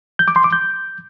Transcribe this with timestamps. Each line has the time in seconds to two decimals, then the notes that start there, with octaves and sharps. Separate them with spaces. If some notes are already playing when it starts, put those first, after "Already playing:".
0.19 G6
0.28 D6
0.36 C6
0.44 D6
0.53 G6